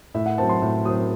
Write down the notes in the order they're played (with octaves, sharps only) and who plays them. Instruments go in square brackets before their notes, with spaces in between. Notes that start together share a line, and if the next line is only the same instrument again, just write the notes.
[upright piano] A2 E5
F#5
F#3 C4 A5
C6
A2
F#3 C4 D#6